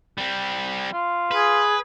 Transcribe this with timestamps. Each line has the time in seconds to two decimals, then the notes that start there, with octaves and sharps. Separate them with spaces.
0.18 G3 C4
0.93 F4
1.31 G#4 B4